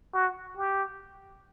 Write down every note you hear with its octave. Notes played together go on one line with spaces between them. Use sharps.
F#4
G4